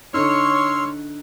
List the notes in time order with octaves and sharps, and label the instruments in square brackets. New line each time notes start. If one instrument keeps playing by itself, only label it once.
[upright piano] D3 D#4 [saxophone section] C#5 [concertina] C6 E6 F6